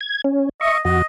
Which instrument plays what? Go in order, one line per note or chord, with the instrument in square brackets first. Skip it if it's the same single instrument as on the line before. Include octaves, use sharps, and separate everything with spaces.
[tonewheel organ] G#6
C#4
[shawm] D#5 [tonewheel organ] E5 C#6
[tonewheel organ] F2 F#4 [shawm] D#5